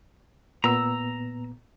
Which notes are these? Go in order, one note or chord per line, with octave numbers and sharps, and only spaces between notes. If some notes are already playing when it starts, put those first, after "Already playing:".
A#2 B3 A#5 E6